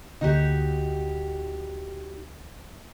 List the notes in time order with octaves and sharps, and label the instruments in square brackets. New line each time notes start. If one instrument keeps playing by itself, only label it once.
[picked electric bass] D2 D3 A#3 [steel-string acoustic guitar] D#4 F#4 G4